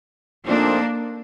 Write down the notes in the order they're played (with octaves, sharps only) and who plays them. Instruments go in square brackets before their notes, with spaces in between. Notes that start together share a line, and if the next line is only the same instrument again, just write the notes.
[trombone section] A#2 F3 A3 C4 D#4 [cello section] A#3 D4